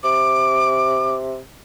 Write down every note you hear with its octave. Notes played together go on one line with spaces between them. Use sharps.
C3 D6